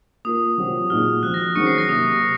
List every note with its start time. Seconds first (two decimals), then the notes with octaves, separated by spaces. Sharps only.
0.25 A#3 F4 A#4 D#6
0.57 C3 F#3 C4 F4
0.90 A#2 G#3 D#4 F#4 F6
1.23 F3 C4 F#4 F#6
1.34 A#6
1.55 D#3 F#3 C#4 G#4 C5 C#6 C#7
1.66 C7
1.78 A#6
1.89 C3 F#3 A#3 D#6
2.22 C3